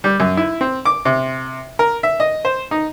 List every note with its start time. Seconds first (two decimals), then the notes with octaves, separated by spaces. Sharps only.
0.04 G3
0.20 F#2
0.37 E4
0.61 C4
0.85 D6
1.05 C3
1.79 A#4
2.03 E5
2.20 D#5
2.45 C5
2.71 D#4